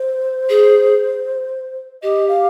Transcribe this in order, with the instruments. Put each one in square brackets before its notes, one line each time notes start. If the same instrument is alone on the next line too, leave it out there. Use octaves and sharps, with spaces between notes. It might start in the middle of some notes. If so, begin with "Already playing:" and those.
Already playing: [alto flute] C5
[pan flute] G#4
[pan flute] G4 [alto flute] D#5
[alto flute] F5